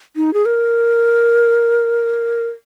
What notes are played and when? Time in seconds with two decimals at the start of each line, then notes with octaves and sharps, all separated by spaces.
0.16 D#4
0.34 G#4
0.45 A#4